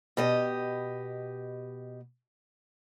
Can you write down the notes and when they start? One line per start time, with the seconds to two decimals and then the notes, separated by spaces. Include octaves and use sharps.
0.17 B2 G4 D#5